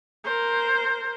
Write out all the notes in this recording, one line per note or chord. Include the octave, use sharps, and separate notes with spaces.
A#4 C5